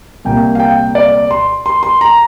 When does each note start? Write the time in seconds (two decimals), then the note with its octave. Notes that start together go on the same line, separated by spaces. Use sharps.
0.25 C2 A#2 A#3 G5
0.55 F5
0.60 G5
0.95 D5
1.31 C6
1.66 C6
1.83 C6
2.01 A#5